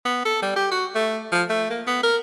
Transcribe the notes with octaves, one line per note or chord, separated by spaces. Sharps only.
B3
A4
G3
G4
F#4
A3
F3
A3
A#3
B3
A#4